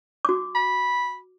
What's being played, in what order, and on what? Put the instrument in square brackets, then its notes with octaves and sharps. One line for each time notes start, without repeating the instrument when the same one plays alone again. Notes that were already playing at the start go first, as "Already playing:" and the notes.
[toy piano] F#4 D6
[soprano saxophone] B5